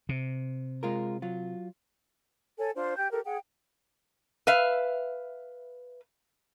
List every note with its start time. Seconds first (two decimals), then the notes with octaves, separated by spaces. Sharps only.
0.09 C3
0.83 G#3 F4 A#4
1.22 F#3 F4
2.59 A4 C#5 G#5
2.75 D4 F4 C5
2.97 G4 G5 G6
3.11 G4 A4 A#4
3.25 G#4 F#5 G5
4.47 B4 E5 F5